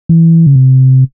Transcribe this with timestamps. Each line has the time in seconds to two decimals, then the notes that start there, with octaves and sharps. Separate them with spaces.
0.09 E3
0.47 C#3
0.56 C3